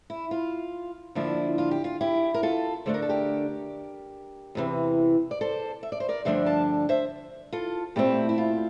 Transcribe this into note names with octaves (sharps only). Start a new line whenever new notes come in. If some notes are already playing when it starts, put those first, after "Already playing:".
E4
F4
D3 F3 A#3 D4 E4
F4
G4
F4
E4 G4
A#4
F4 A4
D3 A3 D4 C5
A#4
A4
G4 A#4
E2 C3 E3
D5
A4 C5
E5
D5
C5
A#4 D5
G2 D3 F3 A3 D4 C5 E5
F5 A5
C5 E5
F4 A4
A#2 A3 C4 E4 G4
E4
F4